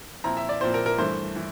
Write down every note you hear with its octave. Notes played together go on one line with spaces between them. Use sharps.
A#2 F3 C4 E4 A#5
E5
D5
A#2 F3 C4 E4 C5
A#4
A#4
G2 E3 A3 D4 C5
E3